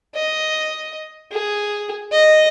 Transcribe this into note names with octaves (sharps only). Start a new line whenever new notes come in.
D#5
G#4
D#5